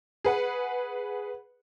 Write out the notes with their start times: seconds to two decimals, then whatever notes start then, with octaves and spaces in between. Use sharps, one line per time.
0.24 G#4 B4 F#5